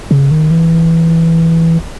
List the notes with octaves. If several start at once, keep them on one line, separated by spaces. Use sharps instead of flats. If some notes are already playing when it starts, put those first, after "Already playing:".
C#3
D#3
E3